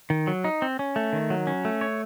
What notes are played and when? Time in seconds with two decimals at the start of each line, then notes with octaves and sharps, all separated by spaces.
0.10 D#3
0.27 F#3
0.44 D#4
0.62 C4
0.79 C#4
0.96 A3
1.13 D#3
1.30 F#3
1.47 C#4
1.65 A3
1.81 C#5